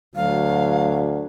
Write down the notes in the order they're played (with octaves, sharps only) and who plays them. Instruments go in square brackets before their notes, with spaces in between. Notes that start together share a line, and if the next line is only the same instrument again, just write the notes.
[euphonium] D2 [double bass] F#3 [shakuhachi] F5